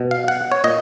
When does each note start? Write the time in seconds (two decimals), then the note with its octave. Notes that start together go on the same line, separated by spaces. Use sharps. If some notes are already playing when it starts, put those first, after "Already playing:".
Already playing: B2
0.11 F5
0.28 F#5
0.52 C#5
0.64 A#2 D#5